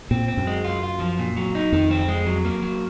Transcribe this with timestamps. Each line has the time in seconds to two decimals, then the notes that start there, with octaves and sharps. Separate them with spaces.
0.11 A#2 C4
0.28 C4
0.37 F#2
0.47 G#3
0.65 F4
0.83 F4
1.00 F3
1.19 A#2
1.37 F#3
1.55 D#4
1.73 F2 D#3
1.91 C4
2.09 G#3
2.26 F#3
2.45 A#3
2.62 F#3